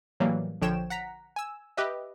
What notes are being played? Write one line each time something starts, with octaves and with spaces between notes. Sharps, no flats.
A2 E3 F#3 G3 A#3
A#1 D3 F3 C#5 G5 E7
F#5 A#5 B6
G#5 E6
G4 B4 D#5 E5